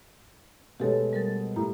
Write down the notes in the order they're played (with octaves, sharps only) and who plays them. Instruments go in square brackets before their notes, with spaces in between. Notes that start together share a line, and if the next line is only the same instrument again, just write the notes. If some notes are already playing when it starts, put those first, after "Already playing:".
[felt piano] B2 G#3 A3 [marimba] G4 A4 C#5
[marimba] G3 A#4 A6
[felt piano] A2 [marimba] G4 A#5